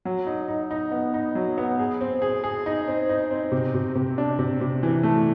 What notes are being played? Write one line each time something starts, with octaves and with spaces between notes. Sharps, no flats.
F#3
D#4
D#4
D#4
B3
D#4
F#3
B3
G#4
C4
G#4
G#4
D#4
C4
D#4
C4
C3
C3
C3
D4
C3
C3
E3
A3